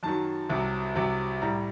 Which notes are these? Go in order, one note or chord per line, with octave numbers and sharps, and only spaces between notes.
F#2 D#3 F#3 A5
C2 C3 F#3
C2 C3 F#3
A2 G3 A#5